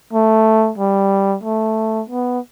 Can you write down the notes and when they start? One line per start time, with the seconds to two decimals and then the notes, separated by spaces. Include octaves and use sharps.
0.13 A3
0.78 G3
1.44 A3
2.10 B3